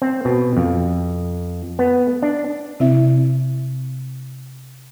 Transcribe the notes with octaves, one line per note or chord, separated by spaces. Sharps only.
C4
B2
F2
B3
D4
C3 C4 E4 E5